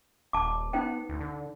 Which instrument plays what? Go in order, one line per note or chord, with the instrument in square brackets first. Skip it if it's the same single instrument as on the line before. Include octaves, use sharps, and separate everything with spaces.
[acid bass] D#1 [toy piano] A5 D6
[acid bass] B3 [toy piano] D#4 C5 G5
[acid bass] D2
D3